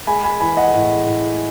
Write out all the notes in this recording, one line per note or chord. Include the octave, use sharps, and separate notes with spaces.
G#3 G#5 B5
G#5 B5
E3 G#5 B5
D#5 F#5
A2
A2